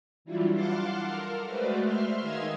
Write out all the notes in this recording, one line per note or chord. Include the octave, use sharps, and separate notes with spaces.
E3 F#3 G3 D4 E4 F4
F5 F#5 A5 C6 D6 F6
A4 A#4 F6
G#3 A3 F#4 B4 C5 D5
E5 C6 F6
D#3 G#3 D#5 F5 E6 G#6